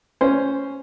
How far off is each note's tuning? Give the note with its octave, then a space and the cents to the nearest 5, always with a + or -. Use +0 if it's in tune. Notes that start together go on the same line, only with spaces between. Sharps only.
C#4 +0 C5 +0